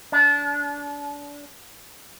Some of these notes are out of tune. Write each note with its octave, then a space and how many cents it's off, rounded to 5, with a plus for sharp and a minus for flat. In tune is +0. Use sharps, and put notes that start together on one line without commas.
D4 -30